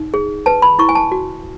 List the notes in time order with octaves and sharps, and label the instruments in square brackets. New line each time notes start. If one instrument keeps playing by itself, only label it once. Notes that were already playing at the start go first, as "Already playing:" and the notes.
Already playing: [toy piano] D#4
G#4
B4 A5
B5
E4 C#6
G#5
A5
F#4